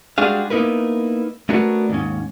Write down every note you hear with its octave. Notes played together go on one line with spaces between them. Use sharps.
G3 G#3 D4 F#4 G#4 F5
A#3 B3 D#4 E4 A#4 B4
A3 B3 C#4 D4 F#4 A#4
D#2 G#2 C#4